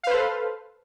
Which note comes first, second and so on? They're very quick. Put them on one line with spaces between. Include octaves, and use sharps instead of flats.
F5 B4 C5 A4